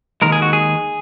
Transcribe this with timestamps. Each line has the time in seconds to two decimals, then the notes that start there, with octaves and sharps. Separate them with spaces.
0.22 D#2 D#3 G#3 A#4
0.32 G#4
0.42 F#4
0.53 G#4